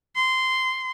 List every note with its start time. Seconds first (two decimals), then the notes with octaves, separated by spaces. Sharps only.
0.16 C6